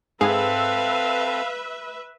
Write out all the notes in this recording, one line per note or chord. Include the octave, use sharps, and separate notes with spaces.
G#2 C4 G#4 A4 B4 E5 F5